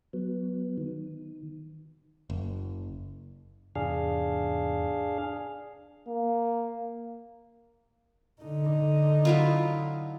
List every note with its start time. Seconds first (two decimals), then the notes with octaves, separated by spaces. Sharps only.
0.13 F#3 B3
0.78 D#3
2.30 F#1
3.76 E2 G#2 C3 D4 G#4 F5
6.08 A#3
8.42 D3 D#4
9.25 F#3 E4 F4